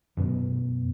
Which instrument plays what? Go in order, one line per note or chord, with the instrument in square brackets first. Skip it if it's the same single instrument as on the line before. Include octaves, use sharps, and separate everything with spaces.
[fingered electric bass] F#2 B2 B3